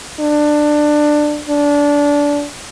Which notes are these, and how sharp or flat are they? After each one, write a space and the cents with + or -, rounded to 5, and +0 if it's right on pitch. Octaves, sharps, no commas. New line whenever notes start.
D4 +15
D4 -20